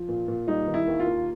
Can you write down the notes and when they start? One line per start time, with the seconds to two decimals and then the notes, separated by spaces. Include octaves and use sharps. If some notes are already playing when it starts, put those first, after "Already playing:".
Already playing: F3
0.09 A#2
0.28 A#2
0.47 G3 D#4
0.67 D#3
0.74 E4
0.87 D#2
1.00 F4
1.06 A#3